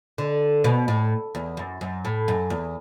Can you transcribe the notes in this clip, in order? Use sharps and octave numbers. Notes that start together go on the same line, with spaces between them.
D3
B2
A2
E2
F#2
F#2
A2
F#2
E2